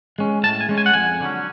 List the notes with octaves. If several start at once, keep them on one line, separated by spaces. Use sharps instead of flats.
G#3 C#4
A2 A5
G#5
G#3 C#4
G#5
F#5
F2 G#5
D3 F#3 C#4